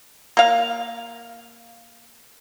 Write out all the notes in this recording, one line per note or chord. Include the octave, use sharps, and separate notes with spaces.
A#3 F5